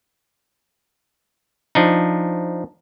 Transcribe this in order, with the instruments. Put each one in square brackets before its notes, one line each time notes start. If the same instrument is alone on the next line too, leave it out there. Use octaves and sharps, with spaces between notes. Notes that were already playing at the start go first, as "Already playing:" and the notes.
[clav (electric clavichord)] F3 D4 D#4